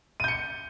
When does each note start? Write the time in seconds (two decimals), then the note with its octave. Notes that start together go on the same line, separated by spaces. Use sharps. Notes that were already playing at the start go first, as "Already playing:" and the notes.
0.20 D#7
0.24 G6
0.28 C#7